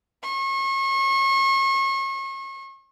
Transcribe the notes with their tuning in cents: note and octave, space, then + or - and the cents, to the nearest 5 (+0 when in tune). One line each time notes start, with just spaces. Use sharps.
C#6 -40